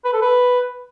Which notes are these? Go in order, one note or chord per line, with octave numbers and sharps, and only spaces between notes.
B4
A4
B4